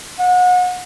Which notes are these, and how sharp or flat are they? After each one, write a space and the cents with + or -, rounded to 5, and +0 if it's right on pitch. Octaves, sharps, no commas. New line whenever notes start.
F#5 -35